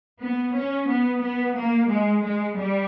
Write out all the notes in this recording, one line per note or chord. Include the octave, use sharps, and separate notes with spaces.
B3
C#4
B3
B3
A#3
G#3
G#3
G3